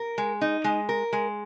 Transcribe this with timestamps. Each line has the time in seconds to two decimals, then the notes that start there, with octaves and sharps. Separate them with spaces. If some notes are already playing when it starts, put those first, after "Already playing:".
Already playing: A#4
0.18 G#3
0.41 D#4
0.64 G#3
0.89 A#4
1.13 G#3